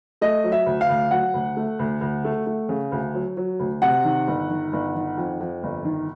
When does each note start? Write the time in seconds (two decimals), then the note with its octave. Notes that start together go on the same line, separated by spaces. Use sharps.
0.21 A3 D#5
0.44 F#3
0.52 E5
0.66 D2
0.81 F5
0.90 D2
1.11 F#3 F#5
1.34 D2
1.57 A3
1.79 D2
2.01 D2
2.25 A3
2.46 A3
2.69 C#3
2.92 D2
3.14 F#3
3.37 F#3
3.59 D2
3.82 C3 F#5
4.04 D#3
4.27 G1
4.50 D#3
4.73 G1
4.95 D#3
5.18 F2
5.40 F2
5.63 G1
5.85 D#3